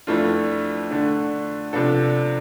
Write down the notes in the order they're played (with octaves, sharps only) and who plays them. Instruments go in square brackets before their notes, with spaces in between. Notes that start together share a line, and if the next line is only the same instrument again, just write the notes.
[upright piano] F2 E3 A3 D4 F4
D3 A3 D4
C3 F3 B3 D4 A4